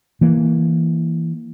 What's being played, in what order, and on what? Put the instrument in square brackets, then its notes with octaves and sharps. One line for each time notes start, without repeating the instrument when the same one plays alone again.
[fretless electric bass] E3 A#3